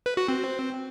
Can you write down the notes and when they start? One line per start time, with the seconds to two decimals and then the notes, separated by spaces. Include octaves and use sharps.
0.06 B4
0.17 F#4
0.28 C4